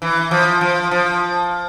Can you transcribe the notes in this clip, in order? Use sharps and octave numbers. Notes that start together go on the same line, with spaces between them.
E3
F3
F3
F3